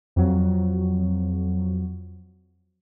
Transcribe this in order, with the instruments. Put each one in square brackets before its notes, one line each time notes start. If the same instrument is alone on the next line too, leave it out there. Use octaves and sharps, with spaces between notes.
[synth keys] F2 F#3